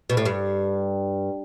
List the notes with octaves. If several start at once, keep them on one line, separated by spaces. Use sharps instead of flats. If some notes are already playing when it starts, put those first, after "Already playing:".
B2
A2
G2